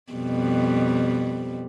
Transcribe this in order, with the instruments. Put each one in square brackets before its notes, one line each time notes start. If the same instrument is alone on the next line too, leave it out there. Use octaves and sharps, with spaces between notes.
[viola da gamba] F2 B2 G3